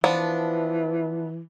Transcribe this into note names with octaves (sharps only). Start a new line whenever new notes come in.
E3 F3 B3 D4